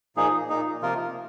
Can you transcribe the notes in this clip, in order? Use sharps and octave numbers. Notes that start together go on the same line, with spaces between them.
A#2 F3 A#3 D#4 G#4
A#2 A#3 D#4
C3 F3 A#3 F4 A#4